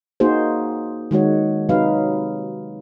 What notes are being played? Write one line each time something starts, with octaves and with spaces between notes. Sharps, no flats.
A#3 D#4 F#4 G#4 C5
D#3 G#3 F#4 C#5
C3 F#3 D#4 B4 F5